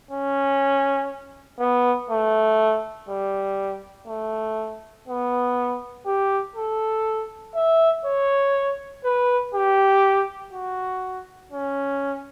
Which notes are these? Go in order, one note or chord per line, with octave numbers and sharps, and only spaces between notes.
C#4
B3
A3
G3
A3
B3
G4
A4
E5
C#5
B4
G4
F#4
C#4